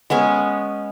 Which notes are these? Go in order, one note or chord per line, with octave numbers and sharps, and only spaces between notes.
G#3 B3 C#4 G#5